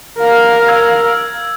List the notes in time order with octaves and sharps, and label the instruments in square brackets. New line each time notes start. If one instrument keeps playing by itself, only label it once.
[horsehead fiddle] A#4 F5
[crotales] E6 G#6